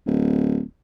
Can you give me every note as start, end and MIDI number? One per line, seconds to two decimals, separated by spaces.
0.07 0.62 26